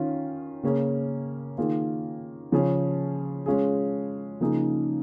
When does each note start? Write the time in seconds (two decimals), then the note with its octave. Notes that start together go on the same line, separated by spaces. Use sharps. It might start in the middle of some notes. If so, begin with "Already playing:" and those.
Already playing: D#3 C#4 F4
0.63 C#3 A#3 C#4 G#4
1.58 D#3 A#3 F4 G#4
2.52 C#3 F3 C#4 G#4
3.46 G#3 C#4 F4 G#4
4.41 C#3 F3 A#3 D#4 G#4